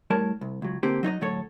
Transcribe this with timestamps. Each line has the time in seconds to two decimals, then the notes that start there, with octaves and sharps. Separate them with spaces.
0.10 A2 G3 A#4 C#5 A5
0.41 C2
0.62 C#2 F#3
0.83 D3 A#3 C4 G4
1.03 F#3 D#4 C#5 D#5
1.21 D2 A2 F#3 A4 C#5